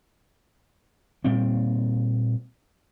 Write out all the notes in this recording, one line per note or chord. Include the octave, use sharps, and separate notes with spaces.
A#2 G3 A#3 C4